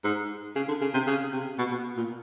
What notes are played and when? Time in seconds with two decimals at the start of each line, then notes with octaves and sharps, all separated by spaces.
0.04 G#2
0.56 C#3
0.68 D3
0.81 C#3
0.94 C3
1.07 C#3
1.32 C3
1.58 B2
1.71 B2
1.97 A#2